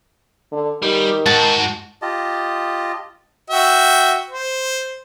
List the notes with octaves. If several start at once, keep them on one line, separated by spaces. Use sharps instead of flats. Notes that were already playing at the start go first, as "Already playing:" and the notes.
D3
D#3 G3
G#2 F#4 A5
F4 G4 D#5 A5
F#4 E5 G5
C5